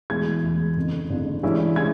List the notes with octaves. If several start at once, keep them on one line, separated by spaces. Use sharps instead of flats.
E1 E2 E3 G#3 G#6
E1 E2 E3 G#3
G1 F2 C#3
G1 F2 C#3
G2 E3 G#3 C#4 E4
E3 G#3 C#4 E4 G#6